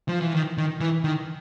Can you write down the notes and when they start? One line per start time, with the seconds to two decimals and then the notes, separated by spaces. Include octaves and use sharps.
0.08 F3
0.21 E3
0.35 D#3
0.58 D#3
0.81 E3
1.04 D#3